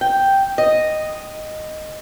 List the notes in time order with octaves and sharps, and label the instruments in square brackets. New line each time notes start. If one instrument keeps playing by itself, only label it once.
[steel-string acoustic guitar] G5
D#5